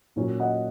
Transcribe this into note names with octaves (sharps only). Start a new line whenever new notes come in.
A#2 F#3 C#4
D#5 F#5